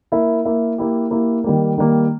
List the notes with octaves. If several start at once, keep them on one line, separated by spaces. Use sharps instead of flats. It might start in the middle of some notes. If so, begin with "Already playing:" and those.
A#3 E4 A#4 E5
A#3 E4 A#4 E5
A#3 E4 G4
A#3 E4 G4
D#3 G3 A#3
D#3 G3 A#3